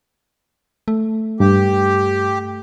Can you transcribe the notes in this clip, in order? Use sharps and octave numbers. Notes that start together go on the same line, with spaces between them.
A3
G2 G4